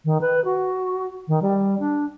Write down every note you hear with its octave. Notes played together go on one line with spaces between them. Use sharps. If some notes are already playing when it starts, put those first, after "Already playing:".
D#3
B4
F#4
D#3
G3
D4